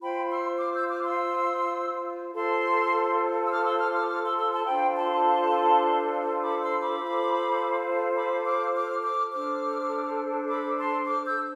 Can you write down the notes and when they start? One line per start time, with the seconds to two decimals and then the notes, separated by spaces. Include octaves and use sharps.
0.02 F4 C5 G5 B5
0.30 C6 E6
0.60 D6 F6
0.74 E6 G6
0.89 D6 F6
1.04 C6 E6
2.34 F4 A4 C5 A5 C6
3.46 E6
3.51 D6 F6
3.65 C6 E6
3.79 D6 F6
3.94 D6 F6
4.09 D6 F6
4.23 C6 E6
4.38 C6 E6
4.52 A5 C6
4.67 D4 F4 A4 C5 G5 B5
4.96 A5 C6
6.41 B5 D6
6.61 C6 E6
6.80 B5 D6
7.00 F4 A4 C5
8.16 B5 D6
8.45 D6 F6
8.75 D6 F6
9.03 D6 F6
9.32 D4 A4 C5 D6 F6
10.48 B5 D6
10.78 A5 C6
11.06 D6 F6
11.26 E6 G6